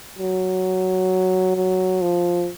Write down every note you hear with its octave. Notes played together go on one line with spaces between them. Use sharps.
F#3
F#3
F3